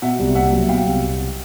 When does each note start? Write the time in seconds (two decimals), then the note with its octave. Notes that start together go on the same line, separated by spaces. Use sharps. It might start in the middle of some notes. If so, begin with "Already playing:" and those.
0.02 B2 E5 F#5
0.19 C2
0.35 A#3 E5 F#5
0.52 F#3
0.68 B2 F5 G5
0.85 C2